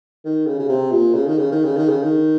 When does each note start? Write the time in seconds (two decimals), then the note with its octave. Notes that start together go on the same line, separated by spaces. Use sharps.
0.25 D#3
0.47 C#3
0.59 C#3
0.69 C3
0.92 A#2
1.14 C#3
1.27 D#3
1.38 C#3
1.52 D#3
1.64 C#3
1.77 D#3
1.89 C#3
2.03 D#3